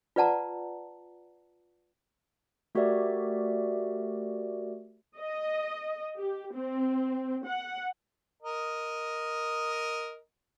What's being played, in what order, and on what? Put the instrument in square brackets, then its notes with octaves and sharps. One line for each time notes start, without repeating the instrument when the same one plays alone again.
[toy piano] F4 B4 D5 F#5 A5 A#5
[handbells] A3 F#4 G4 A#4 D5 E5
[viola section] D#5
G4
C4
F#5
[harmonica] A#4 D#5